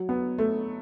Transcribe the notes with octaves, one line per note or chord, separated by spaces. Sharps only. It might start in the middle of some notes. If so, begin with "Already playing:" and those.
Already playing: F#3
B3
A3